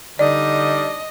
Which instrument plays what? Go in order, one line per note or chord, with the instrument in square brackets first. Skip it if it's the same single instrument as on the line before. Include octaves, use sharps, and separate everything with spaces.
[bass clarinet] D3 [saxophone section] G3 D4 D#4 [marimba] D5 [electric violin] D#5